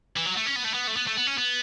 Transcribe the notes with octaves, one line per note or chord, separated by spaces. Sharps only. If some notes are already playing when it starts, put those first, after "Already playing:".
E3
F#3
A3
C#4
B3
A3
B3
A3
B3
A3
B3
C#4
B3